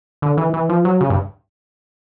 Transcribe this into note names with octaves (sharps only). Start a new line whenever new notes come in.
D3
E3
E3
F3
F#3
C#3
G2